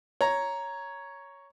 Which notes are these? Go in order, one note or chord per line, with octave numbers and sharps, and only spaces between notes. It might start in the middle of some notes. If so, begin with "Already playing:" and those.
C#5 A#5